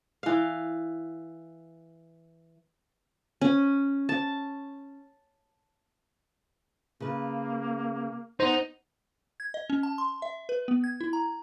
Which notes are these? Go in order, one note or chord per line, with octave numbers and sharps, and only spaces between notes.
E3 F5
C#4
A5
C#3 A#3 B4
B3 D#4 C5
G#6
D#5
C#4
A5
C6
E5
B4
B3
G#6
E4
A#5